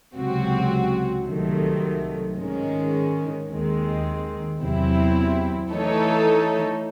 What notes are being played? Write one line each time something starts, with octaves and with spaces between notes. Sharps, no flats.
C#2 C3 F#3 C4 F#4
C2 C3 D#3 F#3 A3
G#2 D#3 G#3 C#4
D#2 D#3 G#3 C4
E2 C3 F#3 C4 E4
E3 A3 D#4 A4 C#5